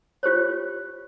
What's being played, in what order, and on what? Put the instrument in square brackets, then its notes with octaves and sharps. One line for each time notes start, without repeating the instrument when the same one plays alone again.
[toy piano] F4 G4 C5 C#5